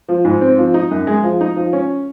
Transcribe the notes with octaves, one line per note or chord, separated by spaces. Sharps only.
F3
G#2
C4
F3
D#4
F#2
G#3
F3
D#4
F3
C#4